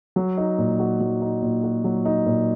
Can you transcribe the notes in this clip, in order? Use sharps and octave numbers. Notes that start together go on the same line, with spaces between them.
F#3
D#4
A#2
F#4
F#3
D#4
A#2
F#4
F#3
D#4
A#2